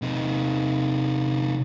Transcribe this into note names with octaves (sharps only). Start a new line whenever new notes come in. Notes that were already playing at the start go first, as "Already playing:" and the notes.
C3 D#4